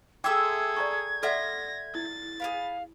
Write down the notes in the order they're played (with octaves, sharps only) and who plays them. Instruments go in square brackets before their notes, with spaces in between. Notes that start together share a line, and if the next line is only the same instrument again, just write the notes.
[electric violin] G#4 A4 [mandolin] E5 C6 E6 [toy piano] G5 D6 [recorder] G#6
[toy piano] D5 A#5 C#6
[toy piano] A4 D5 F#5 [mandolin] E5 C6 F6 [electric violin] A#6
[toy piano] E4 [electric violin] A6
[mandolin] G#4 A#4 B4 [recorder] F5